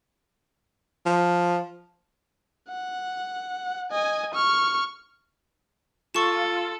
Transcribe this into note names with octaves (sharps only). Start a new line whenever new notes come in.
F3
F#5
D#5 G#5
C#6 F6
F4 A4 C#6 E7